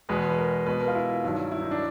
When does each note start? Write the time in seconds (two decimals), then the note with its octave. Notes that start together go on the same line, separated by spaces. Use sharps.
0.09 E2 B2 G#3 B4
0.30 B4
0.38 A#4
0.66 B2 G#3 B4
0.80 A#4
0.88 F4
0.95 E4
1.24 G2 D#3 F#3
1.52 E4
1.61 D#4
1.71 D4